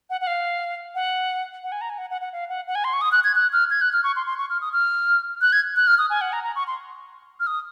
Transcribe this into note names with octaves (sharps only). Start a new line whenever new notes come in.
F#5
F#5
F5
F#5
F#5
G#5
A#5
G#5
F#5
F#5
F#5
F5
F#5
F#5
G#5
C6
C#6
D#6
F#6
G#6
F#6
F6
G#6
F#6
F6
C#6
C6
C6
C#6
F6
D#6
F6
F#6
G#6
F#6
F6
D#6
G#5
F#5
A#5
A#5
C#6
C6
F6
D#6